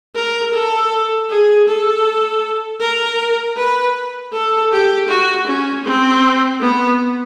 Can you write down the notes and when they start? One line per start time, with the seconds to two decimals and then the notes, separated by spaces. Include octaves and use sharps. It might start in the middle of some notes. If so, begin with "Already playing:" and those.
0.15 A#4
0.53 A4
1.29 G#4
1.68 A4
2.80 A#4
3.57 B4
4.33 A4
4.72 G4
5.09 F#4
5.47 C#4
5.85 C4
6.61 B3